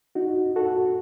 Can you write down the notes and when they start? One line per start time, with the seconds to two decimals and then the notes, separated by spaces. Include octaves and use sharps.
0.15 D#4 F#4
0.56 F#4 A4